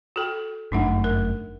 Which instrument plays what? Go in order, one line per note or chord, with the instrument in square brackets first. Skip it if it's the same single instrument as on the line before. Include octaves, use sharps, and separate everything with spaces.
[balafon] F#4 A4 G5
[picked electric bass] G1 F#2 A3 [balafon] D4 D#4 F#5
[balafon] A#4